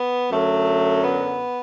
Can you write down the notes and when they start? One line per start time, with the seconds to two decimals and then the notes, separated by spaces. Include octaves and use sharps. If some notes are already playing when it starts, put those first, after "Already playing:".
Already playing: B3
0.31 F#2 D3 F#3 A3
1.04 B3